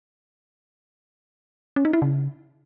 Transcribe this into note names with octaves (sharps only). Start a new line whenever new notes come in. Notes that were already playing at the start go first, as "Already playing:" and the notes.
C#4
D#4
E4
C#3